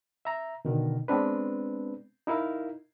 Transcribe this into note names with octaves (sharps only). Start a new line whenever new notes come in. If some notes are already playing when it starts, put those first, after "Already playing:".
E5 A#5
B2 D3 D#3
G#3 B3 C4 D4 B4
D#4 E4 A#4 F5